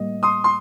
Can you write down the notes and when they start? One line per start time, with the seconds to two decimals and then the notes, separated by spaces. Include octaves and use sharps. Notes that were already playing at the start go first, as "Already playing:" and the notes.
Already playing: A2 G3 A#3 D#5
0.23 C6 D#6
0.44 C6